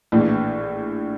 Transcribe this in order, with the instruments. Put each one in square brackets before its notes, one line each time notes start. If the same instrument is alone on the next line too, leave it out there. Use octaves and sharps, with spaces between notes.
[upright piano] A#1 A2 E3